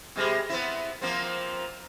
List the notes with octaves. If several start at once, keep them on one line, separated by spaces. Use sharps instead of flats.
B2 G3 G#3
B3 C4 E4
F3 A#3 C4